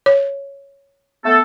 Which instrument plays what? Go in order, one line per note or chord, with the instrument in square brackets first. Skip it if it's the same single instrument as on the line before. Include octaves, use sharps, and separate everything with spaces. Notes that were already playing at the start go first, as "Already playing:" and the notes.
[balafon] C#5
[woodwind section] A3 B3 A4